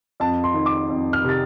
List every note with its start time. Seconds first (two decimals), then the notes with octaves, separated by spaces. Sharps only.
0.20 F2 A5
0.44 C6
0.54 D#3
0.66 D6
0.90 F2
1.13 F6
1.24 C3 A6